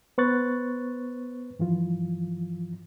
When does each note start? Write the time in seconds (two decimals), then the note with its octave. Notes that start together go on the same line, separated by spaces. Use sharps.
0.18 B3 B4 C5 C#6 F#6 A6
1.59 G2 E3 F3 F4